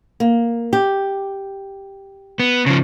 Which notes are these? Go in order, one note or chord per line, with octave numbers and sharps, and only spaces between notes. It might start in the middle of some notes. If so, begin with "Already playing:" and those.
A#3
G4
B3
C#3 F3